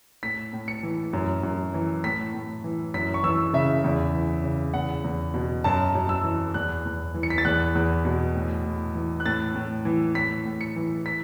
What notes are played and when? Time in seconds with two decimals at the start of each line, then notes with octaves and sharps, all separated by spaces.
0.23 A2 B6
0.53 A2
0.68 C#7
0.83 E3
1.13 F#2
1.43 F#2
1.74 E3
2.04 A2 B6
2.34 A2
2.64 E3
2.94 F#2 B6
3.14 C#6
3.23 E3 E6
3.53 C#3 E5
3.84 E2
4.13 E3
4.44 C#3
4.74 E2 F#5
5.04 E2
5.34 B2
5.64 F#2 A5
5.95 F#2
6.09 E6
6.24 E3
6.54 E2 F#6
6.85 E2
7.14 E3
7.23 C#7
7.30 B6
7.38 A6
7.45 E2 F#6
7.75 E2
8.05 B2
8.35 A2
8.66 A2
8.95 E3
9.20 F#6
9.26 A2 A6
9.55 A2
9.85 E3
10.15 A2 B6
10.45 A2
10.61 C#7
10.76 E3
11.06 B6